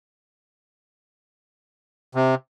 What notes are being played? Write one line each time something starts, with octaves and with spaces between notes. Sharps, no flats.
C3